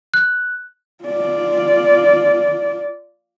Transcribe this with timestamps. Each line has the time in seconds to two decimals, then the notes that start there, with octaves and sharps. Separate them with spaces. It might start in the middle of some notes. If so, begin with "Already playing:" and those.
0.14 F#6
1.04 F4 D5